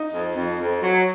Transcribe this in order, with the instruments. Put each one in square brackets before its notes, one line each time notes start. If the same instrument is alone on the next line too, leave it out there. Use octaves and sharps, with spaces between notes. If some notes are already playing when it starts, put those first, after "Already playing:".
Already playing: [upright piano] D#4
[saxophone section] F2
F2
F2
F#3